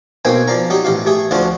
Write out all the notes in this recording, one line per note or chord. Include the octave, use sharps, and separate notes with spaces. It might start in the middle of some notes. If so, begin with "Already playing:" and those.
B1 B2 A#3 C4 G5 G#5
F3 D5 F5 A#5
F#3 D#4 G4
A1 G4 F5
A3 G4 G#4
D2 F3 D4 F4 F#4